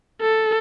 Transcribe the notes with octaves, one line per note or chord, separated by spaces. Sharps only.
A4